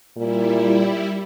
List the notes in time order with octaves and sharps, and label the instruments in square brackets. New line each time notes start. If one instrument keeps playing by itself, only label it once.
[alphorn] A#2 [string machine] G3 E4